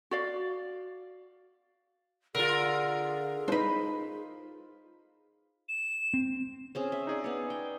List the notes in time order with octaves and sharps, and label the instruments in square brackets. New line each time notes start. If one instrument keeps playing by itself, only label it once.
[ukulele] F#4 D5 F5
[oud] D3 [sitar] F4 A#4 [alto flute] G#4
[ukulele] D4 D#4 [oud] B4 C5
[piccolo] E7
[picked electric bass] C4
[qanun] C4 C#4 G#4
E5
[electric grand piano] D#4 G#4 D5
[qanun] B3 C#5
G5